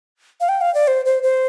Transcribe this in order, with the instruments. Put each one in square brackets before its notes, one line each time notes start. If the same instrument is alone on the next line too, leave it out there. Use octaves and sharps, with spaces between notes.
[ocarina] F5
G5
F5
D5
C5
C5
C5